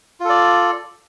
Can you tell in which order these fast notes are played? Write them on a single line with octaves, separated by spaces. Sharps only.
F4 A4 D5